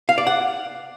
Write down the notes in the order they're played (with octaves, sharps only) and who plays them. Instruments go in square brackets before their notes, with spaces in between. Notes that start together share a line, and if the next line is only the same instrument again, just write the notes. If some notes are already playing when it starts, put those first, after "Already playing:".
[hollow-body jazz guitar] F5
D5
F#5